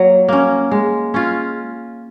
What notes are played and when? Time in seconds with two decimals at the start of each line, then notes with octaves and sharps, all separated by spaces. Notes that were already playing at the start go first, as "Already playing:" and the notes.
Already playing: F#3 A#3 C#5
0.28 A#3 C#4
0.71 G#3
1.14 C#4 F4